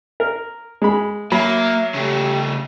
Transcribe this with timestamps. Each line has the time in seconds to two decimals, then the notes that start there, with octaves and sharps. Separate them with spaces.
0.20 A#4
0.82 G#3 B5
1.32 F#3 A#3 E5 B5
1.94 C#3 A3 G4